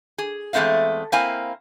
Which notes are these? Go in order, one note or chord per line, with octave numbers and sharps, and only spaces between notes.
G#4
E2 G#3 A3 C4 E5 F5
A#3 C4 E4 F5 G#5